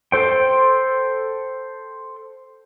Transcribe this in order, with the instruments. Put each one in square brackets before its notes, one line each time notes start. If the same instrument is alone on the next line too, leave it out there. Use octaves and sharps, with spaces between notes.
[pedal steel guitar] A4 C5 G5